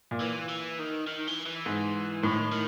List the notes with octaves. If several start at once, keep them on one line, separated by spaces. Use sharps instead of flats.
A#2
E3
E3
D#3
D#3
E3
E3
G#2
A2 D#3
D#3